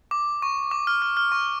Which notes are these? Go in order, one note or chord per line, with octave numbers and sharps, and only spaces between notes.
D6
C#6
D6
F6
F6
F6
C#6